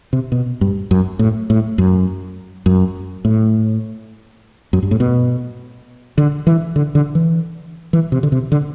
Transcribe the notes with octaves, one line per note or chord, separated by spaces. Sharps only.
C3
B2
G2
F#2
A2
A2
F#2
F#2
A2
F#2
G2
A2
B2
D3
E3
D3
D3
E3
E3
C3
D3
C3
D3